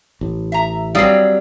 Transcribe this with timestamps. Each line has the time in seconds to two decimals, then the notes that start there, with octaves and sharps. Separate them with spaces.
0.21 A1
0.52 E5 A#5
0.95 F#3 G3 C4 G#4 F5